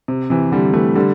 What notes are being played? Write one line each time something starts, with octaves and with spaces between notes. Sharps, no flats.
C3
C3 E3
D3 G3
E3 A3
D3 G3